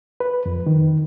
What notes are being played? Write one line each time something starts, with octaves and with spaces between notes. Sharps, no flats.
B4
F2
D#3